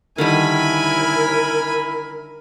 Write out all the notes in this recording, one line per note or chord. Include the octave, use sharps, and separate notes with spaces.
D3 D#3 G3 E4 A#4 G#5 B5